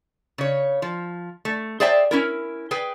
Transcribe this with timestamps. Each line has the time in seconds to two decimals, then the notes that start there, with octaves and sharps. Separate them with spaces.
0.38 C#3 C#5
0.82 F3
1.45 A3
1.80 G#4 C5 D5 E5 G5 A5
2.11 C#4 E4 A#4
2.71 G#4 B4 G5